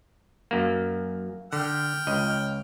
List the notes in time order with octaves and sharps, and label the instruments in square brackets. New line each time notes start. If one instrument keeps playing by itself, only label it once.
[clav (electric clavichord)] F#2 A#3
[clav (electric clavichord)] D3 [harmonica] G5 F6
[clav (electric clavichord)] C#2 D#5